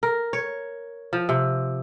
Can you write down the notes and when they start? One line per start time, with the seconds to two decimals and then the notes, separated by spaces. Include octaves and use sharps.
0.03 A#4
0.33 C#5
1.13 F3
1.29 C3